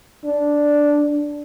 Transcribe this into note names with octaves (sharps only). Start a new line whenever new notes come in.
D4